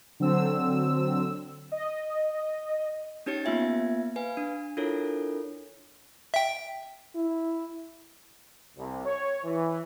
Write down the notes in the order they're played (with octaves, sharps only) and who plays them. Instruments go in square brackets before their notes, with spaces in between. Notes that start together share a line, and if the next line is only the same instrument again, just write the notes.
[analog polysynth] D3 F#3 C4 E6
D#5
[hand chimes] C#4 D#4 G4 C#5 A6 C#7
A#3 B3 F4 E5 G#5 G#6
B4 F5 G#5
D4
D4 E4 F4 A4 A#4 C#5
[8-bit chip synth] E5 G5
[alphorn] E4
[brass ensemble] C2
C#5
E3